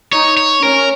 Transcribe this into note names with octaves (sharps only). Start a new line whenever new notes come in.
D#4 C#5
C#5
C#4 A#4